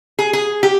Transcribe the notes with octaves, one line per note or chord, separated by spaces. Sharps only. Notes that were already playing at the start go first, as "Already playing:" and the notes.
G#4
G#4
G4